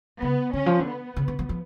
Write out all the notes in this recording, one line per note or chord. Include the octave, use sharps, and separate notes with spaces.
C#3 B3
D3 C#4
F3
D3
B3
C#3
D3
F3
F3